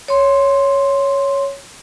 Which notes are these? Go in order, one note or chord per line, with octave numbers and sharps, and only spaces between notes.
C#5 C6